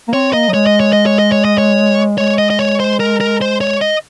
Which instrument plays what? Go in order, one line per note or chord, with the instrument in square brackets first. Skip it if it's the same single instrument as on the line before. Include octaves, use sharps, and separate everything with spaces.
[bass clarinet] A#3
[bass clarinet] C4 [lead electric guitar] C#5
[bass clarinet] A#3 [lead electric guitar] D#5
[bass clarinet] F#3
[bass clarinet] G#3 [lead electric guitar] C#5
[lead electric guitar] D#5
C#5
D#5
C#5
D#5
C#5
D#5
C#5
[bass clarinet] G#3 [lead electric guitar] C#5
[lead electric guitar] D#5
D#5
C#5
C5
A#4
A#4
C5
C#5
D#5